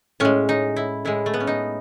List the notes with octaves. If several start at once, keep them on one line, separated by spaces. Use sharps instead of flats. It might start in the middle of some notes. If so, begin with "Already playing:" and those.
A2 G#3 C#4
D#4
E4
A2 G#3 E4
A3
B3
C#4
D#4